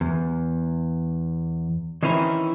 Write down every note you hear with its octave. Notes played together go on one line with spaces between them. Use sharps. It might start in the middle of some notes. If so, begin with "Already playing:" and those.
E2
D#3 E3 C4 C#4 D#4 E4